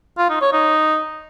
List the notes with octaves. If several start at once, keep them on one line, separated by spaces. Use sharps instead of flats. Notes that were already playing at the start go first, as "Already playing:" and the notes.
F4
D#4
C#5
D#4